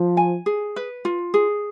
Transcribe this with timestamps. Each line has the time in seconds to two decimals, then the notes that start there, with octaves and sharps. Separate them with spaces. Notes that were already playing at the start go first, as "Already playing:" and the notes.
Already playing: F3
0.17 G#5
0.46 G#4
0.76 B4
1.05 F4
1.34 G#4